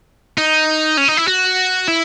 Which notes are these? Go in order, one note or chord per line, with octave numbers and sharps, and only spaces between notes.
D#4
C#4
D#4
E4
F#4
E4